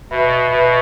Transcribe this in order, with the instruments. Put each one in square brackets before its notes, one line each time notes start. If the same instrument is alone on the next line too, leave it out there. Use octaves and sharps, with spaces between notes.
[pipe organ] B2 [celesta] B4 E5 B5
[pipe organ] B2 [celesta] B4 E5 B5